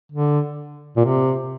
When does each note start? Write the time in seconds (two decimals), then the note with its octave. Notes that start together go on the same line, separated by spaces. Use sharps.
0.12 D3
0.96 A#2
1.05 C3